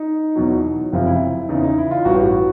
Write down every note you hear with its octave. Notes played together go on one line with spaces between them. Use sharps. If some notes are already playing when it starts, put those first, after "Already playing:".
Already playing: D#4
E2 B2 F#3
F#1 F2 C3 F3
E4
E2 C#3 E3 D#4
D#4
E4
F4
A1 G2 E3 F#4
G4
F#4